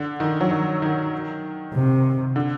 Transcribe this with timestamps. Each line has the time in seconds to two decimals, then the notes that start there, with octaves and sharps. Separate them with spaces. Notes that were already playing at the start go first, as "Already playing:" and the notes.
Already playing: D3
0.20 D#3
0.41 F#3
0.51 D#3
0.82 D#3
1.74 C3
2.36 D3